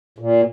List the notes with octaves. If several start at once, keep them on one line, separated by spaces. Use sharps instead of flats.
A#2